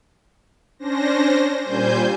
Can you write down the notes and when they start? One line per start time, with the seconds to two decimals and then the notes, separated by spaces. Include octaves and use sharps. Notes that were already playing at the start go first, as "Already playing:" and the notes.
0.79 C#4 D4 C5 A#6
1.64 A#2 G3 C5 G#5 G6